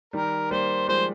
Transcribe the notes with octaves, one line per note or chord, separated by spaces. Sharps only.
D#3 G3 A#4
G3 A#3 C5
F3 G#3 C5